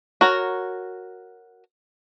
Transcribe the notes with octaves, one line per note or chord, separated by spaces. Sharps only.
F#4 A#4 C#5